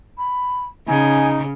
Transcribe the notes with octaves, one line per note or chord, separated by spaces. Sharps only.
B5
C#3 D#4 G#5